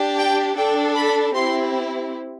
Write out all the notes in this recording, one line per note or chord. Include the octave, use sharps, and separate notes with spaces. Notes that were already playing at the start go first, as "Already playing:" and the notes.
Already playing: D4 G4
G5
D4 A4 G5
B5
C4 E4 G4 C6